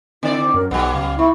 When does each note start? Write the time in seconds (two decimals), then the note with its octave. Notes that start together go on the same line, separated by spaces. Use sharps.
0.23 D3 C4 E4 D5
0.54 F#2 A#4
0.71 B1 F#3 B3 F#5
0.94 C#2 F5
1.19 B3 E4 C#6